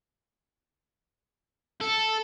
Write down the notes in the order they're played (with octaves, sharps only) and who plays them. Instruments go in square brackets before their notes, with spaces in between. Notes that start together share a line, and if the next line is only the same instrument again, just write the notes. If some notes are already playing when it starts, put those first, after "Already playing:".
[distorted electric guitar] A4